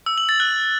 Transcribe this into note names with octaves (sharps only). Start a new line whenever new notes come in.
E6
F#7
A6
F#6